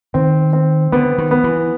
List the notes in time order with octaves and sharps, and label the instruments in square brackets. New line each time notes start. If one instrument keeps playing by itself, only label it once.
[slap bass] D#3 [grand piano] C4
[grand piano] C4
[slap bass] D3 [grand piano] B3
[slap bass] D#3
[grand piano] B3
[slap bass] E3